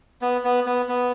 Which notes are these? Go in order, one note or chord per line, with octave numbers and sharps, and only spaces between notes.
B3
B3
B3
B3